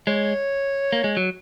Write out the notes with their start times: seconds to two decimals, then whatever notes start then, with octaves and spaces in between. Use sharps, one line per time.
0.07 G#3 C#5
0.93 A#3
1.04 G#3
1.17 F#3